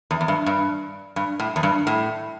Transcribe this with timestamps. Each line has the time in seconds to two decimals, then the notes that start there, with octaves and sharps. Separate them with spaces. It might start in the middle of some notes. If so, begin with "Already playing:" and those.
0.11 E2
0.21 E2
0.28 G2
0.46 G2
1.16 G2
1.40 A2
1.56 E2
1.63 G2
1.87 A2